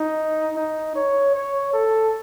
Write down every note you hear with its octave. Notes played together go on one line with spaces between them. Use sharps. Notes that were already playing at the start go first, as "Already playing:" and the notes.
Already playing: D#4
D#4
C#5
C#5
A4